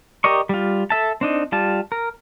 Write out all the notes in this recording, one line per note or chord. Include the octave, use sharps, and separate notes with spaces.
G4 A#4 D5 D#5 C#6
G3 F4
A4 E5 A5
C4 D4 D#4
G3 F4 A5
A#4